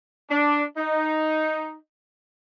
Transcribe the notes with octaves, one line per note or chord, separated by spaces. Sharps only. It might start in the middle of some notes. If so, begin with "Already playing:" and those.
D4
D#4